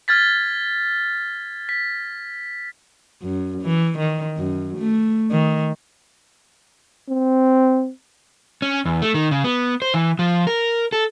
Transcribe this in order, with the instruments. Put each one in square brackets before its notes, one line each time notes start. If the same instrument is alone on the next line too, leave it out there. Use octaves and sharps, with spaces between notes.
[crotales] F6 G#6 A6 B6
B6
[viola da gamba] F#2
E3
D#3
F#2
A3
D#3
[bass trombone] C4
[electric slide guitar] C#4
E2
A3
D#3
C#3
B3
C5
E3
F3
A#4
A4